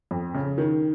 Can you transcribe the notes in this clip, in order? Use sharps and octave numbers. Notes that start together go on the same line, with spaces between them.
F2
C#3
D#3